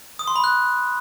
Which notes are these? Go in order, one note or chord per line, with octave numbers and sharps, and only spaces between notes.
D#6
C6
B5
F#6